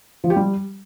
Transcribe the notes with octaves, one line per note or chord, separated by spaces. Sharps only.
F3
G4
G3